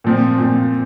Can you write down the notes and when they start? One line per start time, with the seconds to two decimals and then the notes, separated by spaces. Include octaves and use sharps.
0.04 A#2 F3 C4
0.38 A#2 F3 C4